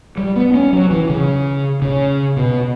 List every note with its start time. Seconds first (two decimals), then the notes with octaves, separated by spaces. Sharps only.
0.18 G3
0.36 B3
0.54 C#4
0.73 F#3
0.91 E3
1.09 C#3
1.82 C#3
2.37 B2